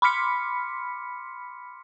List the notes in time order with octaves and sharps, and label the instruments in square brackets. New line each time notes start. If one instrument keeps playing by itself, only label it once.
[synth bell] B5 C6 D6 F6 B6 C#7